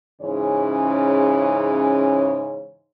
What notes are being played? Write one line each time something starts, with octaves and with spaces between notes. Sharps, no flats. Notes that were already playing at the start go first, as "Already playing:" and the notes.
G#2 C#3 E3 C#4 C#5